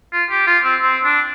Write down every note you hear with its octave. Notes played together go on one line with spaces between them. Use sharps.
F4
G4
F4
C4
C4
D4